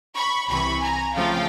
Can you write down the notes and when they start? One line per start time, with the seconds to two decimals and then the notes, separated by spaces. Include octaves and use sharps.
0.16 B5 C#6
0.49 C2 C3 E3 B5 C#6
0.82 G#5 A#5
1.15 C#3 F3 A3 C4 F5 G5